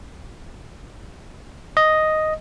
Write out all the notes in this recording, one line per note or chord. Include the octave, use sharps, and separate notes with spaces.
D#5